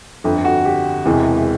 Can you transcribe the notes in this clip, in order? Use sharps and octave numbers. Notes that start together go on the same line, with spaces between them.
G1 F2 D3
F#4
G4
E1 E2 C3 E3 G#3